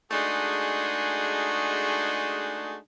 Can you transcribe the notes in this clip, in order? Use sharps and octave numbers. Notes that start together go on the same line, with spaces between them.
G#3 A3 D4 D#4 F#4 G#4